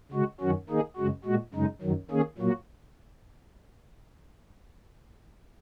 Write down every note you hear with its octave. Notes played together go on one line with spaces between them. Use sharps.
C#3 G#3 F#4
F#2 D#3 F#3 C#4 F#4
D#3 A#3 D#4 G#4
F#2 C#3 G#3 F#4
A#2 G#3 F#4
F#2 C#3 G#3 D#4
F#2 D#3 F#3
D#3 A#3 C#4 G#4
A#2 F#3 A#3 F#4